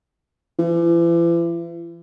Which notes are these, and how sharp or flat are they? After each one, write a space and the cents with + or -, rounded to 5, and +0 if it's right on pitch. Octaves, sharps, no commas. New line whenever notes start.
E3 +40